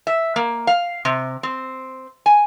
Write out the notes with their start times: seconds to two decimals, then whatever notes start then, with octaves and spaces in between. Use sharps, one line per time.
0.07 E5
0.36 A#3
0.67 F5
1.05 C3
1.43 C4
2.26 G#5